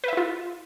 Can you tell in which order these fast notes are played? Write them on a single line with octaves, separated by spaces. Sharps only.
B4 E5 E4 F4